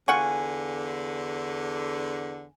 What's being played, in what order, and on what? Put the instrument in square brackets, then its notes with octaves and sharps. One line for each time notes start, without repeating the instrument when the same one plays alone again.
[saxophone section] E2 D3 [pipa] F4 F#5 C#6 [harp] G#5